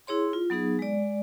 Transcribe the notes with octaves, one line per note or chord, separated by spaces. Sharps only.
E4 G#4 C#5 C6
F4
F#3 B3 D#4 G#4
G#3 D5